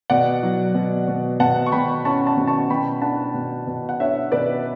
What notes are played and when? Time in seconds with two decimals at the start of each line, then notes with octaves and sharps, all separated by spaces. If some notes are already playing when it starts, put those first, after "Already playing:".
0.10 B2 D5 F#5
0.43 F#3
0.75 B2
1.08 B2
1.40 B2 F#5 A5
1.66 C#6
1.72 B2 G5 B5
2.05 C#4 A5 C#6
2.26 A5 C#6
2.37 B2
2.47 A5 C#6
2.70 B2 G5 B5
3.02 D4 F#5 A5
3.34 B2
3.67 B2
3.89 F#5
4.00 D4 C#5 E5
4.32 B2 B4 D5